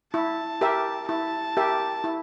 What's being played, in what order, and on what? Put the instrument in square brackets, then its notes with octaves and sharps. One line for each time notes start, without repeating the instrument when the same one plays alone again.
[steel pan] E4 [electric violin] A5
[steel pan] G4 A#4 E5
[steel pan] E4 [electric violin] A5
[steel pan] G4 A#4 E5
E4